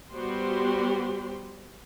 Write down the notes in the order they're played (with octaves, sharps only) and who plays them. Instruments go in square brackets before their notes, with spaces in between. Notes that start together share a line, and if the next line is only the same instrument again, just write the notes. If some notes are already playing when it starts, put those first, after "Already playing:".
[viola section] G3 B3 F#4 G4 C5 C6